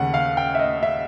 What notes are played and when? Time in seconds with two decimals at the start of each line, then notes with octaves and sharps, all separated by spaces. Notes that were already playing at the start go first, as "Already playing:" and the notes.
Already playing: D#2 C#3 F#5
0.14 F5
0.37 G5
0.55 E5
0.59 D#5
0.83 E5